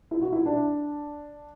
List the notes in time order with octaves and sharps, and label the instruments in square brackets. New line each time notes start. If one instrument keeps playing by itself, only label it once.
[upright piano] E4
F#4
E4
D4